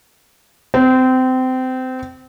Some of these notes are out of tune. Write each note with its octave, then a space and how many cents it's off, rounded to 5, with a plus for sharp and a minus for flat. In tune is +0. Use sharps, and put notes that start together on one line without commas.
C4 -25